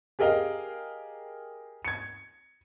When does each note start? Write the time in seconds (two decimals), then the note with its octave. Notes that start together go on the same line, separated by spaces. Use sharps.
0.19 G4 G#4 A#4 D#5 F5
1.85 G#6 C#7